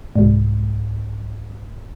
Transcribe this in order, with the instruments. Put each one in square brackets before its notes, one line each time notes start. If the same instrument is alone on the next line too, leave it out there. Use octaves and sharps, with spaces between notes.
[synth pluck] C2 G#2